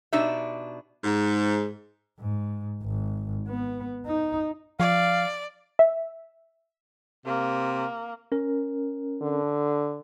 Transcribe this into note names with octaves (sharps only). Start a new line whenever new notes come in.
B2 D4 D#4 G4 E5
G#2
G#2
G#1
B3
D#4
F3 D5 F5
E5
C3 A#3
C#4 A#4
D3